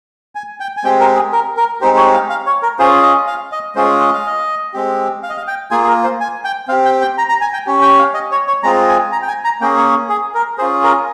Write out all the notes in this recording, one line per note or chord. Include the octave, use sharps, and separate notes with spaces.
G#5
G5
G#5
G#3 C4 G4 G5
A#4
G#4
A#4
A#4
G#3 C4 D#4 G4 C5
C#5
F5
F5
C#5
A#4
C#4 F4 G#4 C5
D#5
F5
D#5
G#3 C#4 F4 G#4 C5
D#5
F5
D#5
G#3 C4 G4
F5
D#5
F5
G5
A#3 F4 G#4 G#5
G#4
A#4
C5
G#5
G5
C4 G4 F5
G5
G5
A#5
A#5
G#5
G5
C#4 G4
G5
F5
D#5
C#5
C#5
G#3 C4 F4 G#4 A#5
G#5
A#5
G5
G#5
A#5
A#3 C#4 G#4 G5
C#5
G#4
A#4
C#4 F4 G#4 C5
A#4